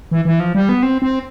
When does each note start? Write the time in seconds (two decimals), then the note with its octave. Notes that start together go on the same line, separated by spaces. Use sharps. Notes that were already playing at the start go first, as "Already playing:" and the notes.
0.11 E3
0.25 E3
0.40 F3
0.55 G3
0.69 B3
0.83 C4
1.02 C4